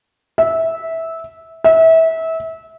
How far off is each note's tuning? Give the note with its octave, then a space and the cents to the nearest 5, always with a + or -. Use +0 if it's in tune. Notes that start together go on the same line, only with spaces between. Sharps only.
E5 -15
E5 -25